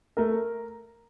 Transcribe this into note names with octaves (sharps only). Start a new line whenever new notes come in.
A3 A#4